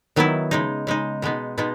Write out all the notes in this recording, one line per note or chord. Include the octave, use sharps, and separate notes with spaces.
D#3 F#3 B3 E4
C#3 G#3 D#4
C#3 G#3 D#4
B2 G#3 B3 D#4
B2 G#3 B3 D#4